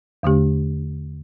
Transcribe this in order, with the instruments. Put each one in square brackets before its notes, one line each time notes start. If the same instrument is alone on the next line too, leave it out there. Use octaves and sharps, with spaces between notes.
[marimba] E2 D3 A3 D4 G4